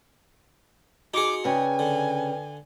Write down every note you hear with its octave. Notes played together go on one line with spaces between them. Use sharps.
D#4 F#4 G#4 D6 C#7
C#3 B4 D5 G5 G#5
D3